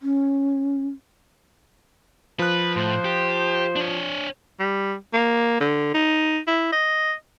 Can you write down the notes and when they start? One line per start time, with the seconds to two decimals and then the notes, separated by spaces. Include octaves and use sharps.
0.02 C#4
2.39 F3 B4 F#6
2.76 A2 C5
3.05 G4
3.76 D4 C#5
4.59 G3
5.13 A#3
5.60 D3
5.94 D#4
6.47 E4
6.72 D#5